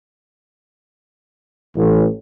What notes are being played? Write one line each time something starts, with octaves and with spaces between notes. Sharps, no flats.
A1